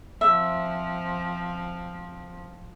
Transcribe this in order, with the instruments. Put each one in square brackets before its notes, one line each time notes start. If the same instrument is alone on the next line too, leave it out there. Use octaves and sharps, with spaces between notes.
[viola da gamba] F3 C4 [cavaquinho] E5